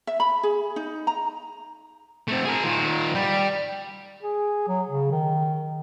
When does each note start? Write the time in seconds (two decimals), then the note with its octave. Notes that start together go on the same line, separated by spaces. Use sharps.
0.07 E5
0.20 B5
0.43 G#4
0.76 D#4
1.07 A#5
2.28 A3 C4
2.45 G#4 A#4
2.64 D#3 F4
3.15 G3
4.22 G#4
4.68 F#3
4.89 C#3
5.11 D#3